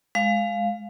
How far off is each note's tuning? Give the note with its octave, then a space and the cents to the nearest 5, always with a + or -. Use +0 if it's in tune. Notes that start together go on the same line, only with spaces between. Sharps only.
G#3 +5 F5 +0